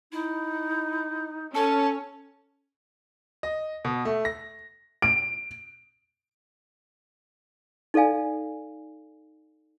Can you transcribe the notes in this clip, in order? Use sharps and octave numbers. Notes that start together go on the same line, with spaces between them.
D#4 E4
C#4 A4 C#5 A5
D#5
B2
A3
A#6
D7
D#4 A4 D5 F5 G#5